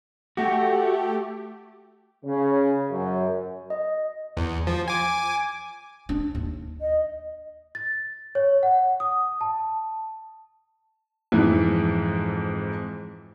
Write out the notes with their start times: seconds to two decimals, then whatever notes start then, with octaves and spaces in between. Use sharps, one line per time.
0.37 A3 F#4 G4
2.25 C#3
2.91 F#2
3.70 D#5
4.37 E2
4.67 F3
4.88 G#5 D6
6.09 D4
6.35 D#2
6.81 D#5
7.75 A6
8.35 C#5
8.63 F#5
9.00 D#6
9.41 A5
11.32 F2 G#2 E3